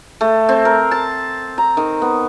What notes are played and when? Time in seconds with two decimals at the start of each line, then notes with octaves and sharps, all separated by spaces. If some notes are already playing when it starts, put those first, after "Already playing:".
0.21 A3
0.49 C4
0.65 A#4
0.91 A5
1.58 A#5
1.77 D#3
2.02 B3